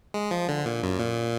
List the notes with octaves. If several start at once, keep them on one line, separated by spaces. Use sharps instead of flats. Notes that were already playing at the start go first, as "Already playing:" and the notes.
G#3
F3
D3
A#2
F#2
A#2